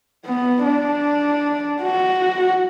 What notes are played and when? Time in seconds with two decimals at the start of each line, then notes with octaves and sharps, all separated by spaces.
0.25 B3
0.64 D4
1.82 F#4